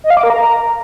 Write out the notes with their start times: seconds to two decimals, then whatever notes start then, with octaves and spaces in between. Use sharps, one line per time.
0.04 D#5
0.10 F5
0.17 D6
0.23 A#4
0.30 A#5